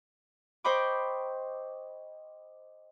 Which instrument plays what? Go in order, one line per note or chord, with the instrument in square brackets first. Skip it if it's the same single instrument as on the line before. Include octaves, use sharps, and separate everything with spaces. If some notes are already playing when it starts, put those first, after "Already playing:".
[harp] C5 D#5 G5 B5 C#6 D6